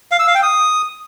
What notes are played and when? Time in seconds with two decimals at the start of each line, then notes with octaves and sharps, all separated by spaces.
0.12 F5
0.19 E6
0.27 F5
0.35 G5
0.43 D#6